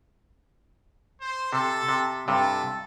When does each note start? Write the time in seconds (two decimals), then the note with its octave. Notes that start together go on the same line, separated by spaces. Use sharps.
1.21 C5
1.53 C3 A4
1.89 C3
2.28 G2 C3 A4